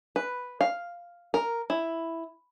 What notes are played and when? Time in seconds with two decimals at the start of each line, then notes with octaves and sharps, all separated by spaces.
0.16 B4
0.61 F5
1.34 A#4
1.70 E4